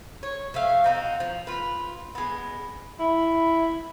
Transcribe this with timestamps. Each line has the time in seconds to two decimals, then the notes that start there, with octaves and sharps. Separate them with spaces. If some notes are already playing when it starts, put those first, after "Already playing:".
0.23 C#5
0.54 F3 A3 E5 F5
0.84 C4 D#4 F#4
1.20 F3
1.47 F4 B4
2.15 G#3 B3
3.00 E4